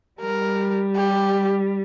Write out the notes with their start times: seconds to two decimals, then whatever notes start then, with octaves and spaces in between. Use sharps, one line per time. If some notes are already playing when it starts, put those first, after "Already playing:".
0.21 G3 A#4
0.96 G4